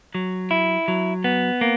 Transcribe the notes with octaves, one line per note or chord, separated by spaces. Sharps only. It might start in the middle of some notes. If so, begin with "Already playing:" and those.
F#3
E4
F#3
B3
A#3